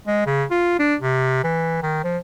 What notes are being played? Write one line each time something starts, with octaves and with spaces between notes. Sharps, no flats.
G#3
C#3
F4
D4
C3
E3
D#3
F3